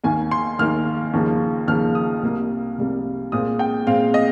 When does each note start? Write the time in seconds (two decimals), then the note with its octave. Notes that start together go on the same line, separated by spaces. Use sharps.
0.03 D#2 D#3 A#3 G#5
0.31 C6
0.59 D#2 D#3 A#3 F6
1.13 D#2 C#3 F3 A#3
1.68 D#2 C#3 F3 A#3 F6
1.95 D#6
2.23 C2 C3 G3 A#3
2.78 C2 C3 G3 A#3
3.32 A#2 G#3 C4 D#6
3.59 G5
3.86 A#2 G#3 C4 F5
4.14 D#5